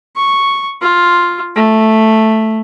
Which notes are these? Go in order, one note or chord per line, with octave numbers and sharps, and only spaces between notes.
C#6
F4
A3